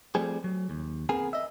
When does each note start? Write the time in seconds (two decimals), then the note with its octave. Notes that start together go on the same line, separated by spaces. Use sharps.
0.15 F3 G3 A3 C4 G#4
0.44 F#3
0.70 D#2
1.09 B3 C4 G#4 A#4 G#5
1.33 D#5 E5